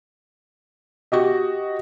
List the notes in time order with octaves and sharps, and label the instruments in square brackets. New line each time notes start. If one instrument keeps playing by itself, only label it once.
[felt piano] F#4 G4 D#5